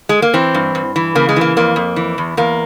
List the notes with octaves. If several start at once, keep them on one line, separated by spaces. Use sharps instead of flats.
G#3
A#3
E3 C4
G2
G2
E3
C#3 A#3
G#3
E3 A#3
F2 A#3
F2
E3
E2
E2 A#3